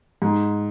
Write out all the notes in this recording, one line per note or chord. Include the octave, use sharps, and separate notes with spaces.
G#2